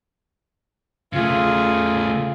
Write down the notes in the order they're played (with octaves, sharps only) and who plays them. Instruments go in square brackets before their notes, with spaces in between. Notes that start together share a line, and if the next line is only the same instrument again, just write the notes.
[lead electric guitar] C#3 A3 [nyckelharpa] F4 G#4